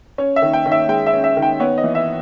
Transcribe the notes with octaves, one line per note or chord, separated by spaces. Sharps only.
C#4 C#5
E5
D#3
G5
D#3
E5
G#3 G5
E5
C#4
E5
D#3
G5
B3 C#5
D#5
E3
E5